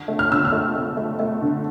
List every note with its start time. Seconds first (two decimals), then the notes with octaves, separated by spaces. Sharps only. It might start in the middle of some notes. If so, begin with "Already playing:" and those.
Already playing: D3
0.08 A3
0.19 F6
0.30 D3 E6
0.45 F6
0.52 A3
0.75 A3
0.97 A3
1.19 A3
1.42 D3